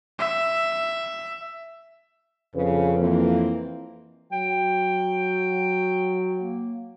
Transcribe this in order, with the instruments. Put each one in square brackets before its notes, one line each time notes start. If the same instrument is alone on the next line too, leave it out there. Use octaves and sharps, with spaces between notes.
[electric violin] E5
[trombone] F2 [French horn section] C#3 B4
[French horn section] E3 A#3 C4
[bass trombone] F#3 [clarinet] G5
[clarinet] A#3